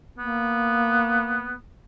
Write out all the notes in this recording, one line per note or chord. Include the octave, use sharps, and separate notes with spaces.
A#3 B3